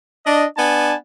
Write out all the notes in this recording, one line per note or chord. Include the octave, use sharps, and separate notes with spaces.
D4 D#5
B3 D4 G#5 A5